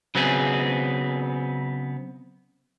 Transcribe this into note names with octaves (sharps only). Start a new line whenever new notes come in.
C#3 F#3 B3 C4 G#4